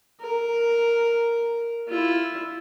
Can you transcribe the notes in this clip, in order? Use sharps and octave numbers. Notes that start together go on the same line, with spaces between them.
A#4
E4 F4